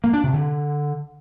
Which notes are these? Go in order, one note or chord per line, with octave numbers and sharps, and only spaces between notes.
A#3
D4
C3
D3